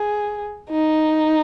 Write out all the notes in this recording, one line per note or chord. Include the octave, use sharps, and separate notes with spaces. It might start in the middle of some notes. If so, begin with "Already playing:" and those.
Already playing: G#4
D#4